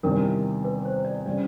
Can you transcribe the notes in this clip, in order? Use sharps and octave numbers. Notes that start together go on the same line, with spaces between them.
E2 C3 D#3 G3 C4 A#4
B4
C5
D5
C#3 E3 G3 D5